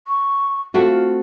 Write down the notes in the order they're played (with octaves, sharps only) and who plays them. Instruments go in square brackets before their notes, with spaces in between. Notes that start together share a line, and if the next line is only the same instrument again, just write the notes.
[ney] C#6
[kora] A3 C4 F#4 [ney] F4